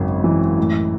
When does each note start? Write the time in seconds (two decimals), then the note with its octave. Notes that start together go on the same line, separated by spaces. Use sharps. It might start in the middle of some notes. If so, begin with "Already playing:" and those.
Already playing: G#1 F#2 C#3
0.24 E3
0.58 A2